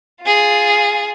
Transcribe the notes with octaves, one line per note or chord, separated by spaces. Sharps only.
F4 G#4